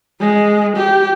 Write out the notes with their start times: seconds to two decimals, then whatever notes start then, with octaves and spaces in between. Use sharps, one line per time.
0.21 G#3
0.78 G4